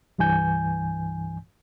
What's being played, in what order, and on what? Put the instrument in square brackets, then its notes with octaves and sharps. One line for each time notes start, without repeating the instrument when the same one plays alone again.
[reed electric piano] C2 G2 E3 G#5 G6